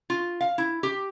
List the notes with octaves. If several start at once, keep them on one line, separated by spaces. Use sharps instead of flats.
F4
F5
E4
G4